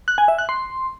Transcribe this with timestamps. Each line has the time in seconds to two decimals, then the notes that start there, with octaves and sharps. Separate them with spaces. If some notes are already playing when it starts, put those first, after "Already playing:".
0.08 F#6
0.18 G#5
0.28 E5
0.38 F#6
0.49 C6